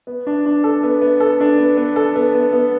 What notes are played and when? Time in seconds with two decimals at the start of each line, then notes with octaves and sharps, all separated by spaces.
0.07 B3
0.27 D4
0.46 D4
0.64 A4
0.83 B3
1.01 B3
1.20 A4
1.40 D4
1.58 B3
1.77 B3
1.96 A4
2.16 B3
2.34 B3
2.53 B3